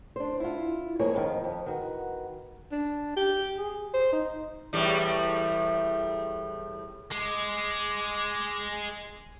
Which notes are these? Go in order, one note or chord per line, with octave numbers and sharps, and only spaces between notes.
D4 C5
E4 F4
F2 A#3 G#4 C#5
F2 A2 D3 D#3 F3
F2
D#3 F#4 B4
D4
G4
G#4
C5
D#4
E2 A2 G3
G#3 D6